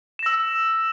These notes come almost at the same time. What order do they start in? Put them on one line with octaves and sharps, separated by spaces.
E7 A#6 E6